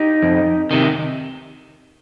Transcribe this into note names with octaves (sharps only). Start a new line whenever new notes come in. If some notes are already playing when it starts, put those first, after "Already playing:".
Already playing: D#4 G4
F2
C3 D#3